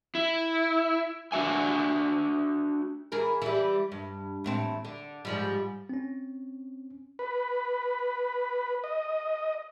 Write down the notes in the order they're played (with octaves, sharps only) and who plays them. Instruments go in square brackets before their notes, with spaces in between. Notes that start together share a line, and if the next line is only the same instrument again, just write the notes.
[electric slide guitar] E4
D4 F#4 E5 G#5
[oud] E3 G#4 A#4
E3 G3
G2
E2 A2 C4
D3
G#2 F3 G3
[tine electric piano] C4 C#4
[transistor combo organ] B4
D#5